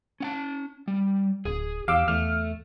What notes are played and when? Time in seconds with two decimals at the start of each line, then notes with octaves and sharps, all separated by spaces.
0.20 C#4 F#5 A5
0.88 G3
1.45 D1 G#4
1.88 E2 G4 F5 D6 E6
2.08 E2 A3 F6